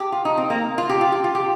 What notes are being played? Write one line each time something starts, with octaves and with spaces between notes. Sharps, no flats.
G4
F4
D#4
C4
A#3
F4
G4
F4
G4
F4
G4